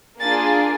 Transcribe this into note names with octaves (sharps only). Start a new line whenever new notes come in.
A#3 D4 F4 G#4 A6